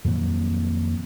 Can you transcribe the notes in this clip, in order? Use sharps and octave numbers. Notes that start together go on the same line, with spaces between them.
F2 A#2 D#3 F#3